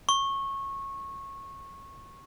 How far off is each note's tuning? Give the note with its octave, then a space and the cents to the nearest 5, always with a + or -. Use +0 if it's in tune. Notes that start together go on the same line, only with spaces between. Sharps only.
C#6 -20